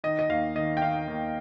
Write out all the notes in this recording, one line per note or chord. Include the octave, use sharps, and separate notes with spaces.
D#3 D#5
D#5
D#2 F5
D#3 D#5
G5
D#3 F5
D#2